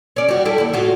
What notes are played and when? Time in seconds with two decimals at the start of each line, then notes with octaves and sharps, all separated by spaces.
0.16 C#4 D5
0.28 G3 F#4
0.45 G3 E4 A4
0.58 D#2 E4
0.73 A2 F4 F#4